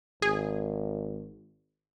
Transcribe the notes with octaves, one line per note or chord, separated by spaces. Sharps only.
G#1 G#4